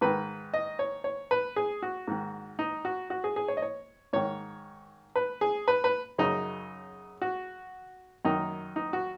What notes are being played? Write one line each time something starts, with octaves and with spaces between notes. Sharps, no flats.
G#2 D#3 B4
D#5
C#5
C#5
B4
G#4
F#4
G#2 D#3
D#4
F#4
F#4
G#4
G#4
C#5
D#5
C#5
G#2 D#3 C#5
B4
G#4
B4
B4
F#2 C#3 D#4
F#4
F#2 D#3 D#4
D#4
F#4